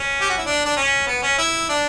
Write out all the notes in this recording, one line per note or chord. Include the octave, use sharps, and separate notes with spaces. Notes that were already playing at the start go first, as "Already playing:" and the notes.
Already playing: C#4
G4
F#4
E4
D4
D4
C#4
B3
C#4
E4
D4